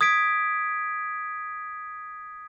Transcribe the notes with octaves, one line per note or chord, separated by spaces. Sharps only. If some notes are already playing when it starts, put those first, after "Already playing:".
D#6 G#6 B6 D7